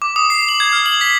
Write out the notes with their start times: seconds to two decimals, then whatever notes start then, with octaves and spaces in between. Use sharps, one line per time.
0.02 D6
0.16 D#6
0.30 C7
0.49 F#7
0.60 G#6
0.73 F6
0.86 F#7
1.01 B6